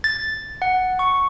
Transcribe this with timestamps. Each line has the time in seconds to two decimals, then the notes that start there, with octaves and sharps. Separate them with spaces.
0.04 A6
0.62 F#5
0.99 C#6